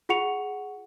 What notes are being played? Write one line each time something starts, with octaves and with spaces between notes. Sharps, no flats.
F4 G#4 F#5 C#6 C#7 F7